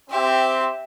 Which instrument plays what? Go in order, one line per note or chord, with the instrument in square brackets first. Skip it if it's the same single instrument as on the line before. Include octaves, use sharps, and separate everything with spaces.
[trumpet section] C4 [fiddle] G4 E5